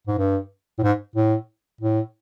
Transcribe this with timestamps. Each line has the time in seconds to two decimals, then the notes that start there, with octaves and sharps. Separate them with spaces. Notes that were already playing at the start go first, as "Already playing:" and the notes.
0.07 G#2
0.18 G2
0.78 A2
0.83 G#2
1.15 A2
1.81 A2